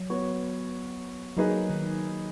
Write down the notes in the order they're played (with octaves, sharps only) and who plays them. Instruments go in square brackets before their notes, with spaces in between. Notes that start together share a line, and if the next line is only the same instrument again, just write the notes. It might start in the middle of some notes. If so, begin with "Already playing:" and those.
Already playing: [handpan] F#3
[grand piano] B3 F#4 C#5
[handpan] F#3 [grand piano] A#3 D#4 G#4 B4 D#5
[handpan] D#3